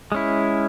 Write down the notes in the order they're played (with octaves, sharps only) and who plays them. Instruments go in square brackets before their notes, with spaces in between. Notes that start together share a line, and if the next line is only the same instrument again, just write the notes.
[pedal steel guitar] G#3 C#4 E4